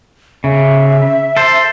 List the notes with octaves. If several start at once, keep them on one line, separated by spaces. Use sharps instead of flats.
C#3 E5
A4 C5